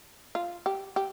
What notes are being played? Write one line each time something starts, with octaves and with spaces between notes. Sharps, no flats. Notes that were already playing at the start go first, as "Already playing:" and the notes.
F4
G4
G4